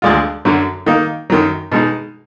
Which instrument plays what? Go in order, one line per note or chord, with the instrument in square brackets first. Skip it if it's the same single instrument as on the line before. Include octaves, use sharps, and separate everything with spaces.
[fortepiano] D2 D3 G#3 D4 F4
F#2 D3 F#3
D#3 A#3 D#4
F#2 D#3 F#3
B2 G#3 D#4